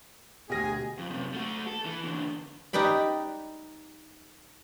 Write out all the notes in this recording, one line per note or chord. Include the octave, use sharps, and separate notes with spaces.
D2 B2 G4 G#4 G#5 A#6
F2
F#2 C3
A3 F#4
A4
E3
E2 D3
D#4 G4 B4 D5 B5